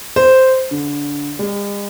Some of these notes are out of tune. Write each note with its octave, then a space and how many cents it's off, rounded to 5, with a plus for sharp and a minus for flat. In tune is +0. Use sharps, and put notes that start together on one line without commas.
C5 -5
D3 -20
G#3 -45